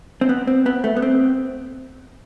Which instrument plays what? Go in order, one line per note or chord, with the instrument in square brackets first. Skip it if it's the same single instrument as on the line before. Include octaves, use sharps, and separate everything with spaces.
[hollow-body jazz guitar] C4
B3
C4
B3
A3
B3
C4